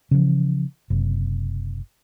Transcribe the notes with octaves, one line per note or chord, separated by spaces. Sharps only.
C#3 E3 F3
F#1 C3